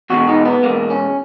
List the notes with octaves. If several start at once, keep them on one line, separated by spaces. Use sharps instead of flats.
E2 B2 G#3 F#4
D#4
B3
E2 B2 G#3 A#3
C#4